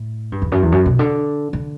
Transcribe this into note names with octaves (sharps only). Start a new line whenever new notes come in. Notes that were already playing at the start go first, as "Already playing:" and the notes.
Already playing: A2
G2
E2
F#2
E2
F#2
B2
D3
D3